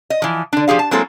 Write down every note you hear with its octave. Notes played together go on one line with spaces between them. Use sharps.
D#5
E3 F3
D3 D4
F3 G4 G#4 F5
A5
F#3 G#3 A#3 C4 E4 A4